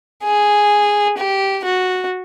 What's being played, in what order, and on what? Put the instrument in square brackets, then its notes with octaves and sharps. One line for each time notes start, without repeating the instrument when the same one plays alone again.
[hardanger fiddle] G#4
G4
F#4